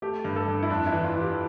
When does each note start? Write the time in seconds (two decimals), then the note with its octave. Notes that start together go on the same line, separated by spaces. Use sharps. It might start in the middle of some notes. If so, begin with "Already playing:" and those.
0.02 A3 G4
0.25 G2
0.36 A4
0.48 G2
0.63 E4
0.70 F2 D4
0.86 E4
0.92 E3
1.04 F4
1.16 E3 G4